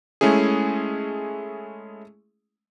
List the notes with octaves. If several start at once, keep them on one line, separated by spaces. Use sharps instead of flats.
G#3 A3 C#4 E4 G#4